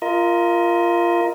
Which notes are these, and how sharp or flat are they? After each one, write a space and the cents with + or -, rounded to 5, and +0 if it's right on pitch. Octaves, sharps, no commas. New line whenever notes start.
F4 -15 A#4 +0 D#5 +25